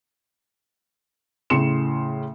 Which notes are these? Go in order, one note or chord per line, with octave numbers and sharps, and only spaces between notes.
A2 C#3 C6 C#7 E7